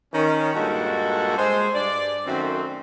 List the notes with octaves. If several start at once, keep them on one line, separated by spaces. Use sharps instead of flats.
D#3 C#4
G2 A#2 G#3 F#4 A4
G#3 C5
G2 D5
F#2 D#3 A3 C4